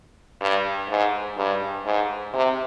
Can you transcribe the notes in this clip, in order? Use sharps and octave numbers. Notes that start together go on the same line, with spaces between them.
G2
G#2
G2
G#2
C3